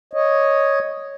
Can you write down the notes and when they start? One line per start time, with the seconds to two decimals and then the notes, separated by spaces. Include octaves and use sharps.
0.13 C#5 D#5